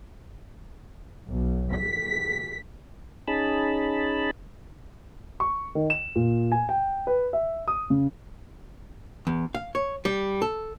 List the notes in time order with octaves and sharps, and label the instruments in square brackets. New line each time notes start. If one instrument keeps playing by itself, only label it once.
[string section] B1
B6
[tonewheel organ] C#4 D#4 G#4 A5 B5
[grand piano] C#6
D#3
E7
A#2
G#5
G5
B4
E5
D#6
C#3
[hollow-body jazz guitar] E2
F5
C#5
G3
A4